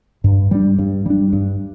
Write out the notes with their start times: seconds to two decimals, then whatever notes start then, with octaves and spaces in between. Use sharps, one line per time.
0.24 G2
0.51 G3 D4
0.79 G2
1.06 G3 D4
1.33 G2